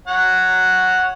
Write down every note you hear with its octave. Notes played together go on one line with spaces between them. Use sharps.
C#5 F#5